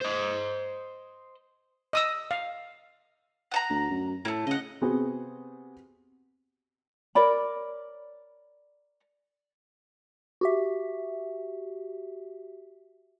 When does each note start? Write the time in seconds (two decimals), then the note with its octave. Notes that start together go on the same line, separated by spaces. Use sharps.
0.02 C5 D#5
1.93 D#5 D#6 E6
2.31 F5
3.51 F#5 A5 A#5
3.70 D2
3.90 F#2
4.25 A2 A3 A#3
4.47 C#3 D#5 F#5
4.81 C3 B3 C4 F#4 G#4
7.15 A#4 C#5 D5 B5
10.41 F#4 G4 E5